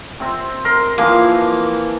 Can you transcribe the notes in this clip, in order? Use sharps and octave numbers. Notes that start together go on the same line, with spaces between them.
C3 C4
A#4 C6
E3 F3 A#3 F5